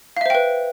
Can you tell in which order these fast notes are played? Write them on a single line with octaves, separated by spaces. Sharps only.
F5 E5 C5 G5 B4